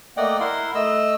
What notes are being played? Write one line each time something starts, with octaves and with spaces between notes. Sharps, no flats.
A3 A#3 D5 D#5 F#5 G5
E4 A#4 F#5 C6
A3 D#5 E6